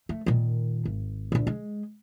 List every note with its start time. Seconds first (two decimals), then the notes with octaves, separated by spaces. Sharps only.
0.09 A3
0.26 A#2 D#3
0.85 G#1
1.32 D2 A#2
1.47 G#3